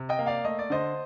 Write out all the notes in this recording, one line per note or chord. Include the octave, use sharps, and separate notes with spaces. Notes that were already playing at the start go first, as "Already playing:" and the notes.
Already playing: C3
D#5 G5
A#3
D5 F5
A3 D#5
D5
D3 C5 D#5